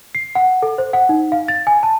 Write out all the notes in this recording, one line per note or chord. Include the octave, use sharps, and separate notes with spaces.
C7
F#5
A4
C5
F#5
D#4
F5
A6
G#5
A5